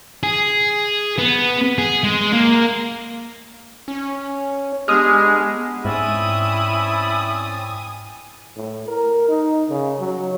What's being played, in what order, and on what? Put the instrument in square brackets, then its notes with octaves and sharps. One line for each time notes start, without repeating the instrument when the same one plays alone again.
[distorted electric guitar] G#4
B3
G#4
G#3
A#3
[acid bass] C#4
[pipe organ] G#3 [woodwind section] B3 D4 G4 [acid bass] G#4 [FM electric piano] D#6 F6
[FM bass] G#2 [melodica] C4 C#4 D5 [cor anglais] E4 [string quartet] G#5 D#6
[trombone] A2
A#4
D#4
C#3
F#3